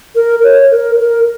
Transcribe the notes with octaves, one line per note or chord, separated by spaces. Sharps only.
A#4
C#5
A#4
A#4